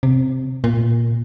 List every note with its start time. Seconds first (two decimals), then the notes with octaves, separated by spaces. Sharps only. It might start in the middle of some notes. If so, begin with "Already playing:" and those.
0.03 C3
0.64 A#2